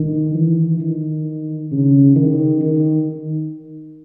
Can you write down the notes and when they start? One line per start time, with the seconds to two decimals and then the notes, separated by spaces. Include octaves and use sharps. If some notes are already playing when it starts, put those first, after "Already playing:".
Already playing: D#3
0.35 E3
0.80 D#3
1.71 C#3
2.16 D#3
2.61 D#3